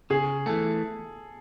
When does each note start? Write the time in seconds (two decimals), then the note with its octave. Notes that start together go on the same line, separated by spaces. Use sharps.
0.10 C#3 G#4
0.46 E3 A3 A4